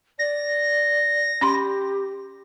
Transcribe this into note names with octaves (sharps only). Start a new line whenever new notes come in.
D5 A#6
C#4 G4 B5 C6